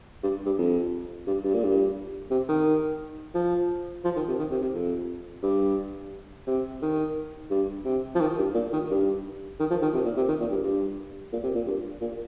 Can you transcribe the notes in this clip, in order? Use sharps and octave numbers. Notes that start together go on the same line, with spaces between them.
G2
G2
F2
G2
G2
A#2
G2
C3
D#3
F3
F3
D#3
C3
D#3
C3
C3
F2
G2
C3
D#3
G2
C3
F3
D#3
G2
A#2
D#3
G2
D#3
F3
D#3
C3
A#2
C3
D#3
A#2
G2
G2
A#2
C3
A#2
G2
A#2